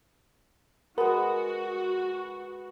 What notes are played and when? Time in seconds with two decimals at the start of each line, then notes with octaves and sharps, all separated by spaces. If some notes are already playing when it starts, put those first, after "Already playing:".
0.98 G#3 B3 F#4 A#4